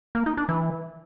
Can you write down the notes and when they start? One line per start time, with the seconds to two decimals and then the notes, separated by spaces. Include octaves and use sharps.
0.15 A#3
0.26 D#4
0.37 D4
0.49 E3